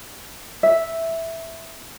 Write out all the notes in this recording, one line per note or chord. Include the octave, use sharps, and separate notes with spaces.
E5